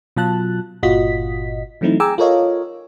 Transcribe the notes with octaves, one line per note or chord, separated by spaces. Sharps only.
B2 F#3 F4 A5 F#6
G1 A#2 F4 F#4 D#5 B6
E3 F#3 A3 C4 D#4 E4
G#4 G5 G#5 A#5 D6 E6
F4 A4 A#4 C#5 D#5 F5